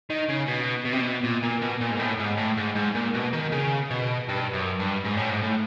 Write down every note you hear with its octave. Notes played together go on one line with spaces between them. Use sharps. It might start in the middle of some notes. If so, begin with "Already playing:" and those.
D#3
C#3
B2
B2
C3
B2
A#2
A#2
B2
A#2
G#2
A2
G#2
A2
G#2
G#2
A#2
B2
D#3
C#3
B2
G2
F#2
G2
G#2
A2
G#2
A2